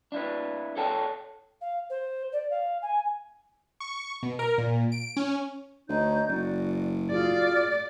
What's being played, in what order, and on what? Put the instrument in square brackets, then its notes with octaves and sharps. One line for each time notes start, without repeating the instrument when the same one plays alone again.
[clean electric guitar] D4 E4 B4
A4 C#5 F#5 G5 A5
[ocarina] F5
C5
D5
F5
G#5
[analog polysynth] C#6
B2
A#4
A#2
D7
C#4
[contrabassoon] D2 [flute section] D#4 C#5 G6
[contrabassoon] F#1 [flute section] F#4 D5
[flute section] F4 F#4 G#4 [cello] D5